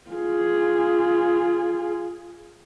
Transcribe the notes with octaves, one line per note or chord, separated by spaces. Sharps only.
F4 G#4